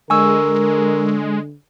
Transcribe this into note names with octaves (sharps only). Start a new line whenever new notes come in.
D3 G#3 A#4 G#5 C#6 E6